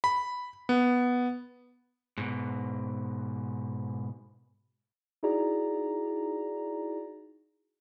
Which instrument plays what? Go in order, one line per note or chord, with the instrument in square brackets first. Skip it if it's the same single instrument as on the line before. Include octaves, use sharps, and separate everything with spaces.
[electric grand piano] B5
B3
[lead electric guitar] G#2 B2
[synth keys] D#4 E4 F#4 G#4 D5 A#5